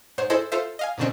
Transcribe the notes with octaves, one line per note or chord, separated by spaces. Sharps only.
G#2 C5 C#5 F#5
E4 G#4 A4 C5 D#5
F4 A4 C5 E5
D#5 F5 G#5
G#2 B2 D3 D#3 C4 C#4